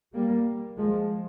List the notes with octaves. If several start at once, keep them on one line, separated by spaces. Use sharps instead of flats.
G3 A#3
F3 G#3